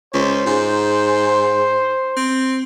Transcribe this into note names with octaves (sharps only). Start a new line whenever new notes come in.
C#2 C5
G#2
C4